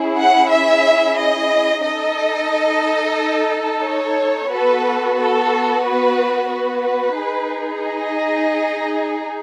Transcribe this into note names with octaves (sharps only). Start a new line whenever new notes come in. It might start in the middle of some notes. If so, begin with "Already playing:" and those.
Already playing: C#4 E4 G#4
F#5
E5
D#5
D#4 A4 D#5
C#5
B3 F#4 A4 B4
A4
B4
B4
D#4 G#4
D#5